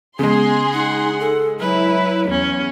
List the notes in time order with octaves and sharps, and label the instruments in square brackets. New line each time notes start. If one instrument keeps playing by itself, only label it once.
[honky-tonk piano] C#3 G#3 [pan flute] B3 [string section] G#4 C6
[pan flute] D#4 [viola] F#5
[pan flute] A4
[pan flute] F#3 [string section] E4 [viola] B4
[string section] E2 [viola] C#4